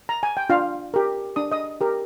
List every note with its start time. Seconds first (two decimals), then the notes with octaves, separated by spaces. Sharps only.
0.09 A#5
0.23 G#5
0.37 G5
0.50 D4 F4 F5
0.94 G4 A#4
1.36 D4 D#6
1.52 D#5 D#6
1.81 G4 A#4